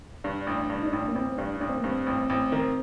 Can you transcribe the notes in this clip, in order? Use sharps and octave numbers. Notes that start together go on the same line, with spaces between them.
G2 D4
A1
G2
D#4
A1 D4
A#3
A1 C4
C4
G2 D4
A1 D4
C4
A#3
G2 C4
A1
A1
D#3